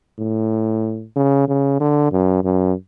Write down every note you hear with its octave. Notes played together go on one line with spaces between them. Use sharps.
A2
C#3
C#3
D3
F#2
F#2